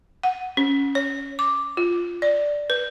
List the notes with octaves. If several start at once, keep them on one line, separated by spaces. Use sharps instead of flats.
F#5
C#4
C#5
D6
F4
D5
B4